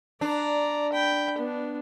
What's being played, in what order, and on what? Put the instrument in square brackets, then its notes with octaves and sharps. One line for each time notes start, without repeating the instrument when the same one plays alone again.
[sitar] D4 [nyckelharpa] D5 A#5
[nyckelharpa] G5 B5
B3 D4